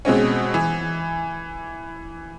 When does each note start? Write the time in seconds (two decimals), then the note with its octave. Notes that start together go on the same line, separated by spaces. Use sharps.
0.05 B2 G#3 C4 C#4
0.54 E3